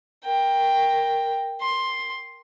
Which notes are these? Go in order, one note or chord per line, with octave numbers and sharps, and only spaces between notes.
A#4 G5
C6